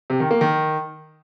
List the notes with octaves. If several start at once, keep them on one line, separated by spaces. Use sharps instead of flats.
C3
D#3
A#3
D#3